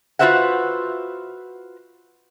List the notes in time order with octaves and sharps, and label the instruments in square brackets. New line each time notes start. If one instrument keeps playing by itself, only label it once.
[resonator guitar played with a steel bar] F4 F#4 B4 C5 E5 F#5